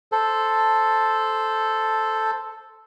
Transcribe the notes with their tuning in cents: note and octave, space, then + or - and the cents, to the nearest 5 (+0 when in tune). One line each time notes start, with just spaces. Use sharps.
A4 +0 C5 +0